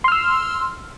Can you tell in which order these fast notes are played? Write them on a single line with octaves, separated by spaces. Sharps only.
C6 F6 E6